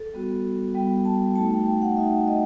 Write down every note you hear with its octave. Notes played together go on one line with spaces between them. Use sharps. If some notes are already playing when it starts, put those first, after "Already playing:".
Already playing: A4
G3 B3 F#4
G3 B3 F#4 G5
A5
A3 D#4 F#4 A5
G5
G5
F#5
A3 D#4 F#4 E5
D#5